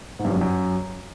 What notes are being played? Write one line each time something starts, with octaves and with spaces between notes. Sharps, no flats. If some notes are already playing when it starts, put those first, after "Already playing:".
G#2
G2
F#2
G2
F#2